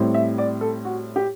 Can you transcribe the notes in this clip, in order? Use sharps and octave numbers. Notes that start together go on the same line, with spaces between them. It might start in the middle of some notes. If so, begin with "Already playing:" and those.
Already playing: A2 G3 C4 E4
E5
D5
A4
F#4
G4